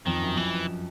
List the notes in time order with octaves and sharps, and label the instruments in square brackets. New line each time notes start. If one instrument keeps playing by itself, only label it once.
[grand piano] F2 [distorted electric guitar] D#3
[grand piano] F#2
[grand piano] F2 [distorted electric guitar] E3